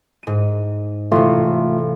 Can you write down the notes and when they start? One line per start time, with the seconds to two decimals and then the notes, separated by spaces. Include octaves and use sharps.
0.23 G#2 D#7
1.12 A1 C3 A3 F4